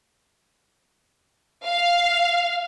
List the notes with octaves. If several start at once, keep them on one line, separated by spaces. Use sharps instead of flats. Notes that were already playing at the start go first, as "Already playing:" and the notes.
F5